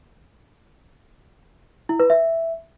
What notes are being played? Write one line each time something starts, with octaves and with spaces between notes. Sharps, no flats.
E4
B4
E5